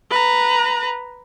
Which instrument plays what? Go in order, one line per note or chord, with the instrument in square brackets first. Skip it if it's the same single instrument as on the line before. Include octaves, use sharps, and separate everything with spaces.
[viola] B4 A#5